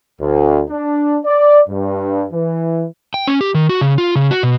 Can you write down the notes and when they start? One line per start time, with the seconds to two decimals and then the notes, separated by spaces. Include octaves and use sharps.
0.21 D2
0.69 D4
1.25 D5
1.69 G2
2.33 E3
3.14 G5
3.27 C#4
3.41 G4
3.55 D#3
3.69 F#4
3.81 C#3
3.98 F4
4.15 C#3
4.31 F#4
4.43 B2